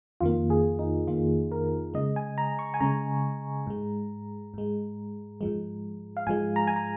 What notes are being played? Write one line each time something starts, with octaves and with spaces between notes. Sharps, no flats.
F2 D#3 A#3 F4
G#4
D#4
F2 D#3 A#3 F4
A#4
C#3 G#3 D#5
G#5
A#5
C#6
G#5
C#3 G#3 A#5
G#2 G#3
G#2 G#3
G#2 F3 G#3
F5
G#2 F3 G#3 G#5
A#5
G#5
A#5